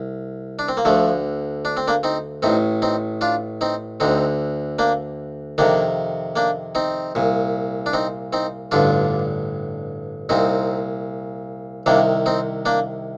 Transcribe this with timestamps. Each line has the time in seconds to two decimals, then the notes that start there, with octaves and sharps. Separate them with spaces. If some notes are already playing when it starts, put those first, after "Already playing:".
Already playing: C2
0.59 D4
0.68 C4
0.77 A#3
0.85 D2 D3 F3 A3
1.65 D4
1.77 C4
1.88 A#3 D4
2.03 C4 D#4
2.42 A1 A2 C4 D#4
2.82 C4 D#4
3.21 D4 F4
3.61 C4 D#4
4.00 D2 D3 C4 D#4
4.79 A#3 D4
5.58 F2 C3 D#3 A#3 D4
6.36 A#3 D4
6.75 C4 D#4
7.15 C2 A#2
7.86 D4
7.93 C4 D#4
8.33 C4 D#4
8.71 A1 G2 D3 D4 F4
10.29 C2 A#2 C4 D#4
11.86 C2 C3 D#3 A#3 D4
12.26 C4 D#4
12.65 A#3 D4